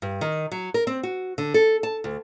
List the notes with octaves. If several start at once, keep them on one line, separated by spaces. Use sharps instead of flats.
G2
D#3
F#3
A#4
C4
F#4
D3
A4
A5
D2